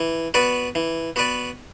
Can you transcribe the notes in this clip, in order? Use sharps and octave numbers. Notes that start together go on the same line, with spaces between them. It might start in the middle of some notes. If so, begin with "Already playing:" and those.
Already playing: E3
B3 F#4 B4 D5
E3
B3 F#4 B4 D5